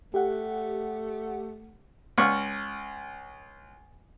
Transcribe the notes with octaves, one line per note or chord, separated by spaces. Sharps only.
A3 G4 F#5
C#2 C#6 F6